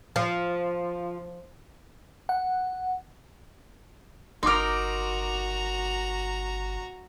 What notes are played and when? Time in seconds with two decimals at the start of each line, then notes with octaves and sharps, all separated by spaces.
0.16 F3
2.29 F#5
4.43 G1 D#4 F#4 A#4 A#5 C6 D6